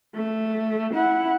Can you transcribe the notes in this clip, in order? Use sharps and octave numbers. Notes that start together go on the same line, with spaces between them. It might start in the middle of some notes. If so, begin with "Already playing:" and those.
A3
E4 F#5